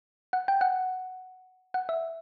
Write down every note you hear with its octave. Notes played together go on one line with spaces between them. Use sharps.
F#5
G5
F#5
F#5
E5